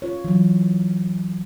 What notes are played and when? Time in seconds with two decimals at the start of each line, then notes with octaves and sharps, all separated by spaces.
0.02 F4 C#5
0.25 E3 F#3